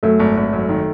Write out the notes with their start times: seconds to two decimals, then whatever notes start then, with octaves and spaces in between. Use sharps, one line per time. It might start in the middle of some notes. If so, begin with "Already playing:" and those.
0.03 F#2 A3
0.20 G#1
0.37 G#1
0.53 F#2
0.69 D#3